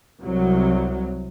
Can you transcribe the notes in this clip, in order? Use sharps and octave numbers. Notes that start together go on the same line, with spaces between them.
C2 F#3